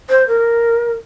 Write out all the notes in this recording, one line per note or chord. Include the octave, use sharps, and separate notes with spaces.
C5
A#4